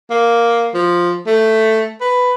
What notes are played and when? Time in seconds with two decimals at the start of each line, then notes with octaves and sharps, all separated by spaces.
0.10 A#3
0.74 F3
1.27 A3
2.01 B4